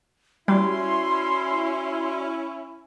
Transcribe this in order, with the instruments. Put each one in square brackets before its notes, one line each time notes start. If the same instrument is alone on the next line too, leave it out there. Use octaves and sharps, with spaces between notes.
[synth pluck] G3 [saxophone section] C#4 E4 [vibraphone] F#4 D5 [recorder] C6